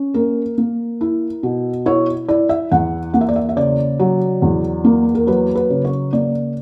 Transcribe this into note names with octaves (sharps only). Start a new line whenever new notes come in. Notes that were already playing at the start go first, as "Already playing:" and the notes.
Already playing: C#4
A#3 A#4
A#3
E4
B2
E4 C#5
E4 D5
E5
E2 F#5
A#3 F#5
E5
D5
E5
E5
C#3 D5
F#3
E2
A#3
A#4
F#3 B4
B4
C#3
C#5
A#3 D5